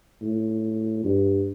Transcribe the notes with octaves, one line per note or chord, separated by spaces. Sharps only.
A2
G2